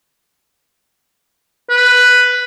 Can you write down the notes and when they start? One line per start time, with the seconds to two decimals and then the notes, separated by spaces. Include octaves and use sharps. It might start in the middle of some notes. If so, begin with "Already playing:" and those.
1.70 B4